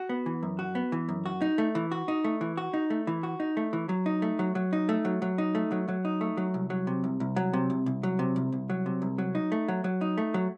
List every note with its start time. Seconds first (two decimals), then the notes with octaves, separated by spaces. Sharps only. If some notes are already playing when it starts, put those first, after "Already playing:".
Already playing: F#4
0.09 B3
0.26 E3
0.43 F#2
0.59 F#4
0.75 B3
0.92 E3
1.09 F#2
1.26 F#4
1.42 D#4
1.58 A3
1.75 E3
1.91 F#4
2.08 D#4
2.24 A3
2.41 E3
2.57 F#4
2.74 D#4
2.90 A3
3.07 E3
3.23 F#4
3.40 D#4
3.57 A3
3.73 E3
3.89 F#3
4.06 D#4
4.22 A3
4.39 F#3
4.55 F#3
4.73 D#4
4.89 A3
5.05 F#3
5.22 F#3
5.38 D#4
5.55 A3
5.72 F#3
5.88 F#3
6.05 D#4
6.21 A3
6.37 F#3
6.54 C2
6.70 F#3
6.87 C3
7.04 C2
7.20 C2
7.36 F#3
7.53 C3
7.70 C2
7.86 C2
8.03 F#3
8.19 C3
8.36 C2
8.52 C2
8.70 F#3
8.86 C3
9.02 C2
9.18 F#3
9.35 D#4
9.52 A3
9.68 F#3
9.84 F#3
10.01 D#4
10.18 A3
10.34 F#3